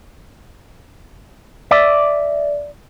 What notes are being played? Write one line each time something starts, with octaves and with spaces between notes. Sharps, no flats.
D5 E5